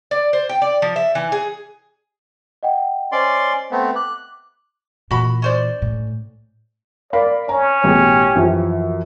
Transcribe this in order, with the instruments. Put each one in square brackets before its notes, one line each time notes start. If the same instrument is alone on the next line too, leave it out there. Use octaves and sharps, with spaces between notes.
[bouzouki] D5
C5
G5
D5
F3
E5
E3
G#4
[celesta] D#5 F#5 G5
[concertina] C#4 D5 C6 [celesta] C5 D#5
[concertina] A3 B3 C4
[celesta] D6 [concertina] F#6
[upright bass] A#2 E3 [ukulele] F#4 B5
[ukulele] C#4 C5 D5
[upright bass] A2
[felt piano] A#4 F5 B5 [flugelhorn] D5
[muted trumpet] C#4 [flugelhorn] C#5 [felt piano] A#5
[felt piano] A1 B2 G#4 [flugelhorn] G4
[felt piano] F#2 E3 F3